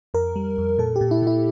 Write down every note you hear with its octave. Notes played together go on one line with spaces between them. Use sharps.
F2 A#4
G3
F2
A#2 A4
G4
A#2
E4
A#2 E4